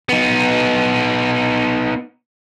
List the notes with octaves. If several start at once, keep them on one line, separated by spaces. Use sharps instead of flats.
B3 D#4